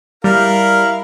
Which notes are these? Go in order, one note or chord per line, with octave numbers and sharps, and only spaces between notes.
G3 E4 A#4 F5